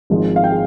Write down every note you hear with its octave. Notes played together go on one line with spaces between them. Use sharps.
G#1 G#2 F3 G#3
F5
G5
G#4